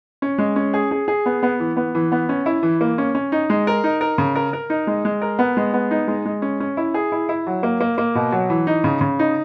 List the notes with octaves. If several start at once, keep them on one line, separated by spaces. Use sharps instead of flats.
C#4
G#3
C#4
G#4
G#4
G#4
B3
B3
E3
B3
E3
B3
C#4
E4
E3
A#3
C#4
C#4
D#4
G#3
A#4
D#4
A#4
C#3
A#4
A#4
D#4
G#3
G#3
A#4
B3
G#3
B3
D#4
G#3
G#3
C#4
C#4
E4
G#4
E4
E4
F#3
A#3
A#3
A#3
B2
F#3
E3
D#4
C#3
C#3
D#4